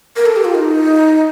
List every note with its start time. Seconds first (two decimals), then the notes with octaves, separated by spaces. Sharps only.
0.16 A#4
0.26 A4
0.36 G4
0.45 F4
0.55 D#4